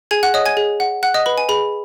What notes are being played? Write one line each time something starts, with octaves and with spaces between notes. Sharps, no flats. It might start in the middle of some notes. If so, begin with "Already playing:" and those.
G#4 G#5 G#6
F#5 F#6
C#5 D#5 D#6
G#5 G#6
G#4
F#5
F#5 F#6
D#5 D#6
B4 B5
G#5
G#4 B5